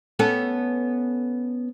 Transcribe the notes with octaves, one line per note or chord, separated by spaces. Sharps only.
B3 C#4 A4